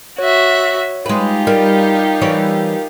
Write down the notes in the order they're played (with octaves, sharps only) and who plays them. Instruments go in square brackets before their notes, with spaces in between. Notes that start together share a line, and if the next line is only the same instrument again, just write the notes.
[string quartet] F#4 E5 [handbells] C#5
[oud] G#3 B4 [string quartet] D#4 F4 G4
[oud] G3 [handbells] A#4
[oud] E3 G3 C#5